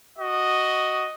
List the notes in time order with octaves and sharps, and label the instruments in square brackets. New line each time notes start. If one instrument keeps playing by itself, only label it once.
[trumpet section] F#4 D#5